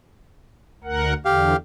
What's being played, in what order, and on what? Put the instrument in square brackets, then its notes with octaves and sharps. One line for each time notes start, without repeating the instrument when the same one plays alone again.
[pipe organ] D2 A#4 F#5
[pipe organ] E2 D3 [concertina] G4 F5